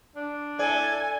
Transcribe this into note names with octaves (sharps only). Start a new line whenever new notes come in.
D4
E4 A4 D5 G#5